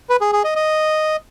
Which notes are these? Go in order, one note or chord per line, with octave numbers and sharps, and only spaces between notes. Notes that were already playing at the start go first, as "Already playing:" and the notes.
B4
G#4
G#4
D#5
D#5